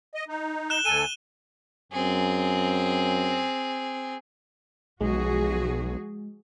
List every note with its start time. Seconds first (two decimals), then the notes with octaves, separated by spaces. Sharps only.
0.15 D#5
0.28 D#4
0.70 F#6 E7 G7
0.85 D2 A4 G#5 D#7 G7
1.92 F#2 C4 G#4
5.01 B1 F3 G#3 F#4 G#4